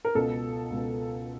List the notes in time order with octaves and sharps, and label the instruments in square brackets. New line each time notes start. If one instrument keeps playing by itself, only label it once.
[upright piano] A#4
C#2 B2 A4
C#2 B2